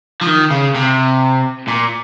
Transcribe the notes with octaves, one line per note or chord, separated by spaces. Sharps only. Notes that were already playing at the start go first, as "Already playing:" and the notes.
F3
D#3
C#3
C3
A#2